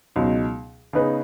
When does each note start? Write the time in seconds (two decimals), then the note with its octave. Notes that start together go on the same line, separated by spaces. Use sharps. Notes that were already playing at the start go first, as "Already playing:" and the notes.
0.16 C#2 B2 F#3 D#4
0.93 C#3 B3 D#4 G#4 B4